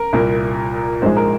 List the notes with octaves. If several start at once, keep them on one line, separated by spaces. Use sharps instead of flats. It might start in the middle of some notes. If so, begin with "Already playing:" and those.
Already playing: A#4
C2 A#2 A#3
A#1 G#2 F3 G#3 C5
A#4